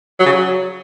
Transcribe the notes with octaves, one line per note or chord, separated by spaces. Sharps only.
F#3
C#3
F#3